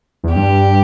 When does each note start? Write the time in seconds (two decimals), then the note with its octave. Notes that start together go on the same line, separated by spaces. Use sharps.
0.24 E2
0.35 G2 G4